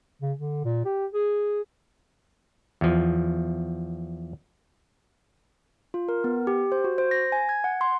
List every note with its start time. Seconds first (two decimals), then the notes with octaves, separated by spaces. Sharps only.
0.22 C#3
0.38 D3
0.64 A#2
0.85 G4
1.13 G#4
2.81 E2 F3
5.94 F4
6.09 A#4
6.24 B3
6.47 G4
6.72 C5
6.84 F#4
6.98 C5
7.11 A#6
7.32 G#5
7.49 G#6
7.64 F#5
7.81 C6